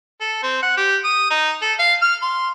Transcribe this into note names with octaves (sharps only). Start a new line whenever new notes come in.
A4
C4
F#5
G4
D#6
D#4
A4
F5
F6
C6